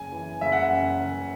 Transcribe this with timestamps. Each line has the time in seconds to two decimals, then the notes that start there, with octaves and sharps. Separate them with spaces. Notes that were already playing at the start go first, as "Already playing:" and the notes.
Already playing: F#1 G#5
0.12 E3
0.41 F#1 E5
0.52 F#5
0.63 E5
0.71 F#2
1.00 F#1